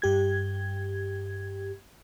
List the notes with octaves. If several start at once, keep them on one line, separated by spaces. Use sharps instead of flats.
G2 G4 G#6